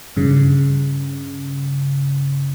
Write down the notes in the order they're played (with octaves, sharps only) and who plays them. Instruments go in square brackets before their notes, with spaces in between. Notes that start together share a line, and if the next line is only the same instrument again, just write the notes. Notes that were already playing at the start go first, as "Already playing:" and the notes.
[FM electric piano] G2 C#3